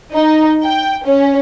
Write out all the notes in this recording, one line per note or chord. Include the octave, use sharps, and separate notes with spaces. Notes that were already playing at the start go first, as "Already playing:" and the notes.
D#4
G5
C#4